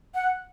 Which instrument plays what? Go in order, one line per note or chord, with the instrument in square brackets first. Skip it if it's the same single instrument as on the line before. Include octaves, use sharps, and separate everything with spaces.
[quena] F#5